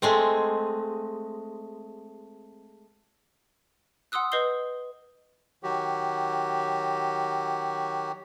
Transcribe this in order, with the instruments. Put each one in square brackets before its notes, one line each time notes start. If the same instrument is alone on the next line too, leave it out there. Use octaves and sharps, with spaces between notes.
[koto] G#3 A3 C4
[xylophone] F#5 C6 D#6 E6 F#6
B4 D#5 D#6 G6 C7 G7
[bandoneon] D#3 F#3 F#4 G4